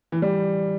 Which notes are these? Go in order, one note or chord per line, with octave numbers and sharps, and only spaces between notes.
E3
G3